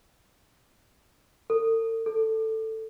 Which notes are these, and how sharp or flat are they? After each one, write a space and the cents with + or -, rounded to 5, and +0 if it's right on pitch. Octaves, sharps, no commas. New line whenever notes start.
A4 +45
A4 +10